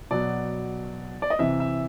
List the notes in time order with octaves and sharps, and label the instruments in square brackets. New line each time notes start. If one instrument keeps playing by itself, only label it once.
[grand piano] B2 F#3 D5
D5
D#5
C3 E3 E5
E5